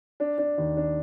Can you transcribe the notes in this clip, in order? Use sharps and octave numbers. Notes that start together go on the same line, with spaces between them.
D4
D4
D#2
D4